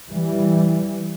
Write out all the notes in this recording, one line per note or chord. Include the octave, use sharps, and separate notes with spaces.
E3 G3